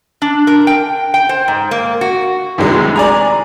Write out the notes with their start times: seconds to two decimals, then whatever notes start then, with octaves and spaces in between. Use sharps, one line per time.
0.22 D4
0.47 A#4
0.67 G5
1.14 G5
1.29 C5
1.48 G#2
1.71 A#3
2.01 F#4
2.58 D2 A2 C3 D#3 F#3 G#3
2.96 D5 G#5 A#5